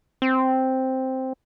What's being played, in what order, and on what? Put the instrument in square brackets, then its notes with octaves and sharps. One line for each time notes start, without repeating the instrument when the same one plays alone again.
[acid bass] C4